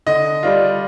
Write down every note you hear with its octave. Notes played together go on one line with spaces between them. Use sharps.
D3 D#5
G3 D4 F4